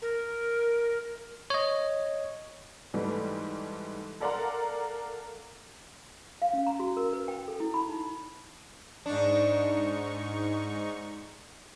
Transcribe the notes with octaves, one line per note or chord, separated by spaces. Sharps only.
A#4
C#5 D#5
G#2 E3 G3 A3
A4 A#4 D5 F5 F#5 A#5
F5
C#4
A#5
F#4
A#4
B4
G5
A4
E4
B5
D#4
G#2 D4 D#4 C#6